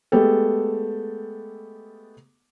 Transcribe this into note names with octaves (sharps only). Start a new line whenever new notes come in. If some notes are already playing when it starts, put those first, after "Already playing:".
G#3 A3 B3 G4 A4